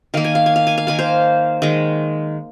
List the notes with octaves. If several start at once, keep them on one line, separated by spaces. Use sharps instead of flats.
D#3 A#3 F5
G#5
F5
G#5
F5
G#5
F5
D#3 A#3 G#5
C5 F5
D#3 G#3